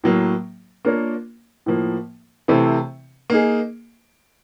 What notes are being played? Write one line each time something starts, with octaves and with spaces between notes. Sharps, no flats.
A2 F#3 A#3
A#3 D4 F4 A#4 C#5
A2 F3 A#3
C3 E3 A3 C4 E4
A#3 D#4 G#4